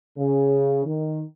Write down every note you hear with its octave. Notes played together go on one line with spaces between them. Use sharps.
C#3
D#3